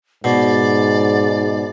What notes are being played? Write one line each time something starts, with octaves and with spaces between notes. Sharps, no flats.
G#2 B2 D5